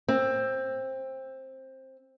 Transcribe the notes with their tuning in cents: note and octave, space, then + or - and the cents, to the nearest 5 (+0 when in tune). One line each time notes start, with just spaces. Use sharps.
C4 +15